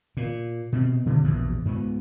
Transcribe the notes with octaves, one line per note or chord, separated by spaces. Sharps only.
A#2
B2 C4
B2 D3 D#3
A#1 E2 B2
G#2 B3